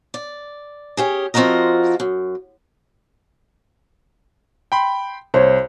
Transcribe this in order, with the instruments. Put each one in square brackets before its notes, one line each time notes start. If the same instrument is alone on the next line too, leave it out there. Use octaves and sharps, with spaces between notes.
[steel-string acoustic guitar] D5
C#4 G4 G#4
F3 C4 F4 F#4 A#4 D#5
F#2
[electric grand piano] G5 B5 C6
[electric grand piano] C2 [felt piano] C5 C#5